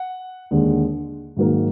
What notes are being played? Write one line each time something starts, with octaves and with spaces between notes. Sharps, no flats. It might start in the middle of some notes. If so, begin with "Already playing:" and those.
Already playing: F#5
D#2 D3 G#3
G#2 D#3 F#3 A#3